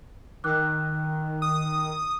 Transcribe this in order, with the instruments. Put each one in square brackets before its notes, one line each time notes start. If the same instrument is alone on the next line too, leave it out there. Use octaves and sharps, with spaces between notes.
[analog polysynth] D#3 [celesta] D6 E6 F#6
[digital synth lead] D#6